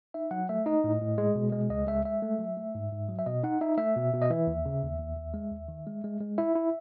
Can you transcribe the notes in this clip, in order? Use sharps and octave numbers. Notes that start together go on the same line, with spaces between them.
D#4 E5
F#3 F#5
A3 E5
D#4 D#5
A2
A2
G#3
B2
G#3
C#2 D#5
G#3 E5
G#3 E5
A3
F#3
A3
G#2
G#2
F#3
E5
B2 D#5
D#4 F#5
D#4 E5
A3 E5
B2
B2
D#5
E3 E5
D#2
C#3
D#2
D#2
D#2
G#3
D#2
D#3
G#3
G#3
G#3
E4 E5
E4